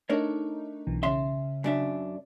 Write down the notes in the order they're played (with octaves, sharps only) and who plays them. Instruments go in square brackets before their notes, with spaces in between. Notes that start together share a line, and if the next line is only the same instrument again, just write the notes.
[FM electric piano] A3 D#4 [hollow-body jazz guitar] D4 A#4 C#5
[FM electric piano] B1 B2 E3
[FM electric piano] C#3 C#4 [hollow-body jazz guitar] E5 C6
[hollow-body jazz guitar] F#2 D4 E5